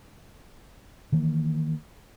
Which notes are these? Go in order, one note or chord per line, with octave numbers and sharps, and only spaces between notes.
D#3 E3 A#3